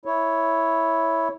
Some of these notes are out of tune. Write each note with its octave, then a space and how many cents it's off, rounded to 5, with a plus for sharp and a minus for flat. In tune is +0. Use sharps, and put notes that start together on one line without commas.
E4 -5 C#5 +0